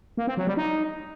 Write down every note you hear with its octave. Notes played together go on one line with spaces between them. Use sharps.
A#3
C4
F#3
G3
D#4